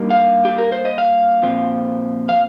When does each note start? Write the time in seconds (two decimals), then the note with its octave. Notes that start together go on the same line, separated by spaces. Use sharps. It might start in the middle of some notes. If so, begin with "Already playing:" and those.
Already playing: G2 G3 A#3 D#4
0.10 F5
0.45 G4
0.58 A#4
0.72 C5
0.85 D#5
0.98 F5
1.42 A#2 F3 C4
2.29 F5